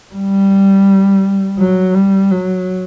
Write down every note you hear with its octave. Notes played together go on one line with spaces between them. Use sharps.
G3
F#3
G3
F#3